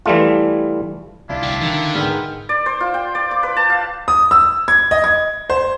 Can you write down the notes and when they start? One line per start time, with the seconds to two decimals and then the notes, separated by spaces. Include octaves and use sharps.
0.06 E3 G3 A3 F4
1.29 C2 D4 E4 F4
1.43 D2 G4
1.61 D3 D#3 C#7 F7
1.95 G#2 B3 A#4 B4 G5 F6
2.49 D5
2.66 C5
2.81 F4
2.94 G5
3.15 D5
3.31 D6
3.43 B4
3.57 A5
3.70 F5
4.08 D#6
4.31 E6
4.68 G#6
4.91 D#5
5.04 G#6
5.50 C5